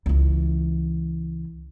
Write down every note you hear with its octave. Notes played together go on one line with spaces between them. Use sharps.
C#2 E3